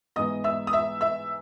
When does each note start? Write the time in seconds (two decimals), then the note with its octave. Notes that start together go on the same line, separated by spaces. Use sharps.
0.16 G#2 E3 B3 D#5 D#6
0.44 E5 E6
0.67 D#6
0.73 E5 E6
1.01 E5 E6